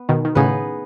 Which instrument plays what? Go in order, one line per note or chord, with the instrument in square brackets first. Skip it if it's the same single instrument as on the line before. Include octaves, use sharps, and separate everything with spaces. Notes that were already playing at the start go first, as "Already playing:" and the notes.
Already playing: [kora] B3
[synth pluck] B2 D#3
D#3
[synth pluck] A2 C#3 [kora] B3 D#4 G#4 B4